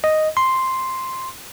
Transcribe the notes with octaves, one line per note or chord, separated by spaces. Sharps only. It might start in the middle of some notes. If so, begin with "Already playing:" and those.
D#5
C6